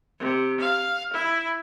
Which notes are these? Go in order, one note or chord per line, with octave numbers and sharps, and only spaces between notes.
C3
F5
E4